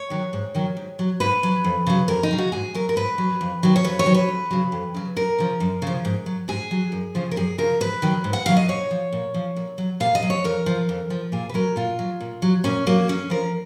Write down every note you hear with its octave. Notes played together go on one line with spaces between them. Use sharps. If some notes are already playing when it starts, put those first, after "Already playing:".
Already playing: C#5
D#3 F#3
G#2
D#3 F#3
G#2
F#3
G#2 B4
F#3
F2
C#3 F#3
F2 A#4
D#4
C#3 F#3
F#4
G#2 G#4
F#3 A#4
A#4
G#2 B4
F#3
F2
D#3 F#3
C#5
F2 B4
C#5
D#3 F#3
B4
F2
C#3 F#3
F2
C#3 F#3
F#2 A#4
C#3 F3
F#2
C#3 F3
G#2
F#3
G#2 G#4
F#3
F#2
C#3 F3
A#4
F#2 G#4
C#3 F3 A#4
G#2 B4
D#3 F#3
G#2
F#5
D#3 F#3 F5
D#5
A#2 C#5
F3
A#2
F3
A#2
F#3
A#2 F5
D#5
F#3
C#5
F2 A#4
F3
F2
F3
A#2 G#4
B4
F#3 A#4
A#2 F4
F#3
A#2
F#3
A#2 C#4
F#3 A#3
F#2 C#4
F3 A#4